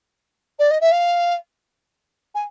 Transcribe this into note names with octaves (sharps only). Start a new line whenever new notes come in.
D5
D#5
E5
F5
G#5